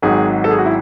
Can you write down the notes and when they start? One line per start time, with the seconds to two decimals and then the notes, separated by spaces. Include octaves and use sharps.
0.02 G#1 G#2 F#3 G#4
0.44 A4
0.51 G#4
0.58 F#4
0.66 E4